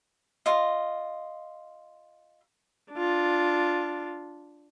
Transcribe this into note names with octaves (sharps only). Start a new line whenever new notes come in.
F4 D#5
D4 F4